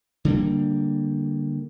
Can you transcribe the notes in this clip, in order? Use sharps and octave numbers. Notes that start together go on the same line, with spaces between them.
D3 G3 A#3